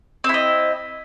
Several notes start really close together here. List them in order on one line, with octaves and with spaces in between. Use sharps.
C4 E4 D#5